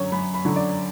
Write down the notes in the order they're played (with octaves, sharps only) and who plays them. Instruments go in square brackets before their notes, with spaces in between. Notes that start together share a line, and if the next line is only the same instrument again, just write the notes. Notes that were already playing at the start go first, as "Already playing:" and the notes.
Already playing: [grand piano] F#2 D3 F#3 C#4 C#5
F#2 B5
B5
D3 F#3 C#4
D5